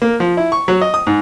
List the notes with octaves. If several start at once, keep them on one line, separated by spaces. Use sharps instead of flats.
A#3
F3
E4
C#6
F#3
D#5
D#6
G#2